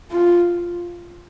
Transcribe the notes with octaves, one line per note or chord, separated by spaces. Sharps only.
F4